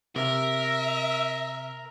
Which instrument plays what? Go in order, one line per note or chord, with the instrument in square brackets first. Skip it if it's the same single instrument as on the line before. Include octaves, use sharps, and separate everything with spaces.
[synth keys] C3 [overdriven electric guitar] A#4 [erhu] E5